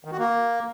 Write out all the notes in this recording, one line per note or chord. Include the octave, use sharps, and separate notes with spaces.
D#3
F#4
A#3